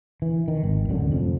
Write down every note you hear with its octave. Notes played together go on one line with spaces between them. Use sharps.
E3
D#3
G#1
D1 F#2 D3
F1 F2